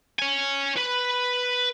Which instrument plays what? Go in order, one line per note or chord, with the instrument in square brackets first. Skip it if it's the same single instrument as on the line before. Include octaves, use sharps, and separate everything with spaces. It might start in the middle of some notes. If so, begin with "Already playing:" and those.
[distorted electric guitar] C#5 G#5
B4 B5